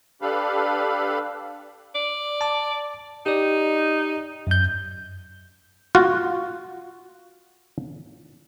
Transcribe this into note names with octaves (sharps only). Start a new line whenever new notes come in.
D4 G4 A4 B4 F5 B5
D5
A5 D6
D#4 G4 D5
F#2 G6
F4 F#4